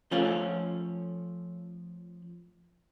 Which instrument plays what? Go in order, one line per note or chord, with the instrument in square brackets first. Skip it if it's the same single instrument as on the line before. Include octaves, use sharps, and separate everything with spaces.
[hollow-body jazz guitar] F3 A3 C#4 F4 C#5